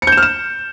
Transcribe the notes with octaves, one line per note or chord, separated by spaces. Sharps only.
C#7
G6
E7
F6
E7